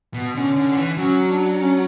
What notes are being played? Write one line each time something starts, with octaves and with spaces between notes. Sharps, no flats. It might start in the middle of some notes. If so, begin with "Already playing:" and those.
B2
D3 C#4
D3
D3
E3
F#3 C#4
D4
C#4